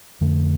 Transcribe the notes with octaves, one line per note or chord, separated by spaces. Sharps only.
F2 D3 A3